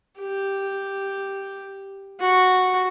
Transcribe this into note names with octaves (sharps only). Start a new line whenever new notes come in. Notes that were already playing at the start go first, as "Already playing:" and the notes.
G4
F#4